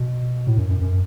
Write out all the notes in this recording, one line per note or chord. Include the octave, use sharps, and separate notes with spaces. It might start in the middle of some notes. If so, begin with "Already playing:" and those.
Already playing: B2
A2
F#2
F#2
F#2